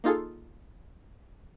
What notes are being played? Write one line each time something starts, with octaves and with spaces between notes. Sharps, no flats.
A#3 D#4 F4 G#4 A4